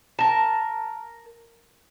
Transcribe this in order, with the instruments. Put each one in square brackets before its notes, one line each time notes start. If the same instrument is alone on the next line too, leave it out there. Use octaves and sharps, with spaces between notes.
[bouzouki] A#4 A5